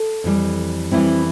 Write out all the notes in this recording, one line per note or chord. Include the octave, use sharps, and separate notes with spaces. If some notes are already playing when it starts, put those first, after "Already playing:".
Already playing: A4
F2 E3 G3
F2 E3 G3 C4 E4